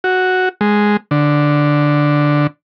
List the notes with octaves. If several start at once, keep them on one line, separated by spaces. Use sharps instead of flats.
F#4
G#3
D3